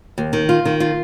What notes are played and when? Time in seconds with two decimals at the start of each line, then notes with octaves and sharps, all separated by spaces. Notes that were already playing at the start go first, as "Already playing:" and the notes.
0.18 D#2
0.33 D#3
0.49 F4
0.65 D#3
0.80 F4